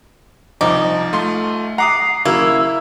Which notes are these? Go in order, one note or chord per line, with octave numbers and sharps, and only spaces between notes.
C2 F3 D#4 D6
A3 F4 C6
F#5 A#5 D6 D#6 C7
C#3 F#3 A#3 E4 E6